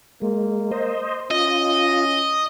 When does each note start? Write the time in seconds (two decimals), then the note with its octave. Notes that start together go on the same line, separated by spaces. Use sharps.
0.22 G#3 A#3
0.71 C5 D#5
1.31 C#4 F4 D#5